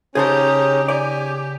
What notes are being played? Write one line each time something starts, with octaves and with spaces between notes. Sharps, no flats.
C#3 C#4 D#4 G4 G#4 C5 A5
G4 D5 G#5